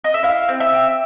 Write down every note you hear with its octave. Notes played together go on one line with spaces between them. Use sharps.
D#5
E5
E4 F5
C4
E5
G4